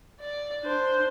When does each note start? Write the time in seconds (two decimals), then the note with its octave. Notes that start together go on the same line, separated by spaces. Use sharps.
0.20 D5
0.62 D4 C5